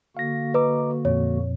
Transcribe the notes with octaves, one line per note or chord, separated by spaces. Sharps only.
D3 A#3 F#4 F5 A#6
B4 D#5 A#5 D6
F2 A#2 C#5